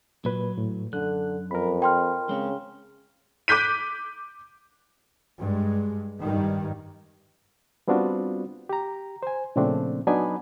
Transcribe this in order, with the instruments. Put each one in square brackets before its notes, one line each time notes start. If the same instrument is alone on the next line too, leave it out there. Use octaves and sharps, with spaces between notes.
[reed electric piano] A#2 B4 [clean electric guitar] F#3
[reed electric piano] A2
[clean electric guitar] F#2 [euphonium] D3 [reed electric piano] F#6
[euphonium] F2 [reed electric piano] A#4 B5
[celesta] G5 C6 F6
[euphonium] C#3 [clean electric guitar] G#3 C4 C#4
[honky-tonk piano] D6 F#6 G6 B6 D#7
[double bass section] G2 G#3
G2 D#3
[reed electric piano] G3 B3 C4 D4 F4 F#4
G4 A#5
C5 G#5
A#2 C#3 F3 A3 C4 D4
F#3 B3 D4 D#4 G#5 B5